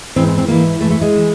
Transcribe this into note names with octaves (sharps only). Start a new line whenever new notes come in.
G#2 E3 C4
C4
C4
G#2 E3 A#3
G#2 E3 A3
A3
G#3
E3